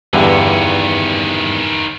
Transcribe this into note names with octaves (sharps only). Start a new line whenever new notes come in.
E2 G2 D3 D#3 C#4